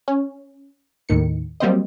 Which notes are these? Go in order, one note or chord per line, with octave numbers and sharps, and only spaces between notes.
C#4
D#2 A2 D#3 C#7
F#3 G3 A#3 C4 C5 D#5